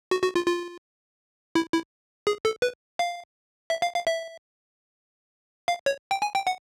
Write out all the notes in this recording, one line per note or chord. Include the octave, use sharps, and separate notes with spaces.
F#4
F#4
F4
F4
E4
E4
G#4
A4
B4
F5
E5
F5
F5
E5
F5
C#5
G5
G#5
G5
F#5